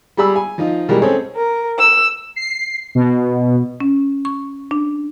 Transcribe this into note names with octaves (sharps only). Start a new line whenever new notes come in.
G3 G4 G#4 B5 E6
G#5
F3 D#4 F4
B2 E3 G3 G#3 G4 A#4
C4 C#4 G#4 A4
A#4
E6
C7
B2
C#4
C#6
D4